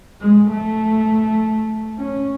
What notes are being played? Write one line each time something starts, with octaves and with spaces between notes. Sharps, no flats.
G#3
A3
C#4